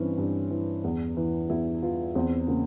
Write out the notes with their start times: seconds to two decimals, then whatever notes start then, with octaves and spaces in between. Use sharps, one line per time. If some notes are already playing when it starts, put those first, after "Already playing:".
Already playing: G2 E3 C4 C#4
0.18 G2
0.51 E3
0.84 E2
1.17 E3
1.49 E2 E4
1.82 E3 F4
2.15 E2 C4
2.47 C#3 A#3